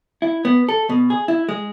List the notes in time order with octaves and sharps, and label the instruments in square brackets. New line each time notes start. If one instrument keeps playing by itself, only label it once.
[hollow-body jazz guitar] E4
B3
A4
B2
G#4
E4
G#3